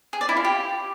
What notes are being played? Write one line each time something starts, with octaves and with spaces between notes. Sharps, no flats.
G#4
D5
E4
F4
G4